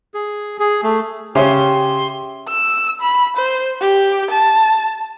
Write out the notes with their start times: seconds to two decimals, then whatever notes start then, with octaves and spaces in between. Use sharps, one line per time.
0.14 G#4
0.59 G#4
0.83 A3
1.35 C#3 C#4 G4 E5 C6
2.49 E6
3.01 B5
3.37 C5
3.81 G4
4.31 A5